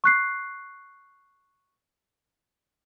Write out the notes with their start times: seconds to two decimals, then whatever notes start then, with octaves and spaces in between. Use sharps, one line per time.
0.04 C#6 F#6 C7